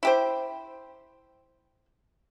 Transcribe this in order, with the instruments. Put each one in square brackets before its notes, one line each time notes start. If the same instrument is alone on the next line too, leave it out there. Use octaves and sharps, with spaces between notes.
[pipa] E4 G4 C5